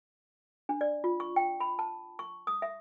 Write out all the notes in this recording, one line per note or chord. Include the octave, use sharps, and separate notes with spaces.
D4
D5
F4
C#6
G5
B5
A5
C#6
D#6
E5